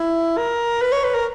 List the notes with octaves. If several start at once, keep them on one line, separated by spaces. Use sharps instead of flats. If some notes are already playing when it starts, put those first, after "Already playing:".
Already playing: E4
A#4
B4
C#5
B4
A#4